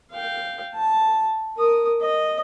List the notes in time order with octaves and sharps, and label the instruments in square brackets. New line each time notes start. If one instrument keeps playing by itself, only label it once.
[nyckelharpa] F5 G5
A5
A#4 D#6
D#5